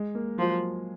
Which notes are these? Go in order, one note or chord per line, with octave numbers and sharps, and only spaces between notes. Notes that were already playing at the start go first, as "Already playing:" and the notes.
Already playing: G#3
A#3
F3 F#3